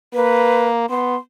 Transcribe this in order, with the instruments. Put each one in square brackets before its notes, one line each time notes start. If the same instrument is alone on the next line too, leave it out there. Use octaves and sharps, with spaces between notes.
[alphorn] A#3 [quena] B4
[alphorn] B3 [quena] C6